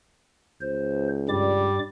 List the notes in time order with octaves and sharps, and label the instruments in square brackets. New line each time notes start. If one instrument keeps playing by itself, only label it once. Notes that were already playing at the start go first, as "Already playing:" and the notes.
[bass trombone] C#2 [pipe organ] C5
[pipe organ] G2 D5 D6 [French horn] G3